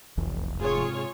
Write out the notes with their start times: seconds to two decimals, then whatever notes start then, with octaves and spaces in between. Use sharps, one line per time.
0.17 F1 B1 E2 E3
0.60 G#2 C3 F4 G#4 C#5